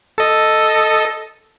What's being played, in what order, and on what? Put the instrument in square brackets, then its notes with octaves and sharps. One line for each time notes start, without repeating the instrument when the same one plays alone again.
[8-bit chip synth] A4 D#5